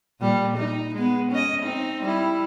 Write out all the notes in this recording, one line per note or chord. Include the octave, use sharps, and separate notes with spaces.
A#2 G3
D#4
G#3 B3
C#4 D#5
C4 D#4
G3 E4